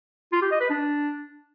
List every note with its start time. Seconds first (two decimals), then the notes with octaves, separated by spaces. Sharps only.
0.32 F4
0.42 G4
0.51 D#5
0.61 B4
0.70 D4